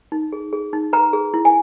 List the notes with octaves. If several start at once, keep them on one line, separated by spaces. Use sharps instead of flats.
D#4
G#4
G#4
D#4
B4 A#5
G#4
E4
G#5